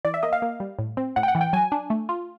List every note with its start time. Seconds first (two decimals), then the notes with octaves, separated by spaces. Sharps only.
0.05 E3 D5
0.14 E5
0.23 A#3 D#5
0.33 F5
0.42 A#3
0.60 G3
0.79 A2
0.97 C4
1.16 A2 F#5
1.23 G5
1.28 F#5
1.35 E3
1.41 G5
1.53 F#3 G#5
1.72 D4
1.90 A3
2.09 F4